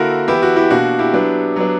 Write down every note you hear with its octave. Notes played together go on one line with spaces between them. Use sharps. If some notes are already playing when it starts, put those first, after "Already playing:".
Already playing: D3 A#3 E4 F#4 A#4
E3 B3 E4 G4
F#4
E4 G4
B2 A#3 D4 F#4
E4 G4
F#3 B3 D4
F#3 B3 D4